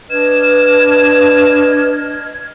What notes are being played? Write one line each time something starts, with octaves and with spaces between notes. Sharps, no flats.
D4 B4 D#5 F6 G#6 E7